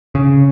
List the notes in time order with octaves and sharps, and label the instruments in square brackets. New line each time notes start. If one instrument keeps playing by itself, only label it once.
[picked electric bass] C#3